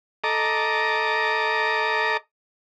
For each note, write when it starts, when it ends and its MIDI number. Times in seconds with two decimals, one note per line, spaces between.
0.24 2.17 69
0.24 2.17 75
0.24 2.17 82
0.24 2.17 86